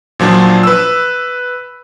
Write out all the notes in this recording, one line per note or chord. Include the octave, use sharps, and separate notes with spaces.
A#2 F3 F#3 D4
B4 E6